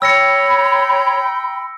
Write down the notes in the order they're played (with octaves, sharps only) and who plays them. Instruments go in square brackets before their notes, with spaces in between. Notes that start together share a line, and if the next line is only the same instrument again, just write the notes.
[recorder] C#5 [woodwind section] G5 [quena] B5 [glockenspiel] E6 A#6 C#7